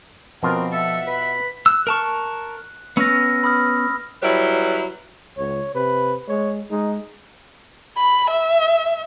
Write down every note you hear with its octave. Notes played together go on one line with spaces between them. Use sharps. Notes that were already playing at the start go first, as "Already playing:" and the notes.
B2 F3 C4 F4 A#4
A4 E5 F#5
B4 B5
E6 F#6
A#4 A5 C#6
B3 C#4 E6 F6 A#6
B5 D#6 F6
F#3 G3 E4 B4 C#5
C#2 C#5
C3 B4
G#3 C#5
G#3 D#4
B5
E5